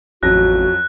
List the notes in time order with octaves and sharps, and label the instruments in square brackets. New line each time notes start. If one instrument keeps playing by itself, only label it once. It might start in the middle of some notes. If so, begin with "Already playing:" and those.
[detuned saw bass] A1 [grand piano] F2 F#3 A#6 [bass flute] F#4 [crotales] F#6